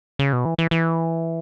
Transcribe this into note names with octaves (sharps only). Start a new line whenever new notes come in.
C#3
B2
E3
E3
E3